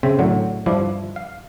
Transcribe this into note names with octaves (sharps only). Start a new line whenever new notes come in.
C#3 C4 C5 E5
A2 D3 F#3
G2 F3 D4 E4
F5